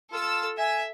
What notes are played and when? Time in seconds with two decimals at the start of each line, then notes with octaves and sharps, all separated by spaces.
0.13 F4 A4 E6
0.58 E5 G#5